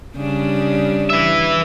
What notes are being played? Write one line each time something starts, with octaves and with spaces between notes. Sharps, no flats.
C#3 G3 D4
B4 E5